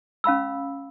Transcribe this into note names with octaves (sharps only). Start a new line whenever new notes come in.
C#4 F5 B5 E6